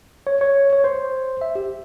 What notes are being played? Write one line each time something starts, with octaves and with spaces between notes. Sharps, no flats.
C#5
C#5
C#5
C5
E5
G4